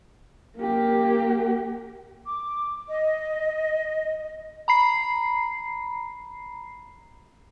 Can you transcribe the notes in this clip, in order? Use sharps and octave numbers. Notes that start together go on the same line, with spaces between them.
A#3 G4
D6
D#5
A#5 B5 C7